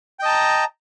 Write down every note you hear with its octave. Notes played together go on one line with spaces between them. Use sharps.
D#5 G5 A5 A#5